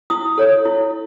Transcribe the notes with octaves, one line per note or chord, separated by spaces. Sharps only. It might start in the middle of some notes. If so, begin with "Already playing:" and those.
E4 D#6
A4 C#5
E4